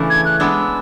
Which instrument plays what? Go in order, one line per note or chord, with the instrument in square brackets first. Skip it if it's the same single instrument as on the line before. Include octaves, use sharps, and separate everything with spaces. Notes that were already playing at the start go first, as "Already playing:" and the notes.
Already playing: [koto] C#3 E3 A3 D4
[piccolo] G#6
F#6
[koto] G#3 B3 D4 [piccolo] E6